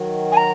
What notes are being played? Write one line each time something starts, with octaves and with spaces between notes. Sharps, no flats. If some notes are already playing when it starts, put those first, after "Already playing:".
Already playing: D#3 F#3
G#5
A#5